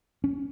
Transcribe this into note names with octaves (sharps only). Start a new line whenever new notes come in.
C#4